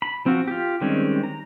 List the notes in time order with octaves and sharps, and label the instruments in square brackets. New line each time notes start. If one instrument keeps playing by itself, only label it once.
[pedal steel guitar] B5
F3 C4 F4 F#4
F4 G4
D#3 G3 G#3 C4 C#4
A#5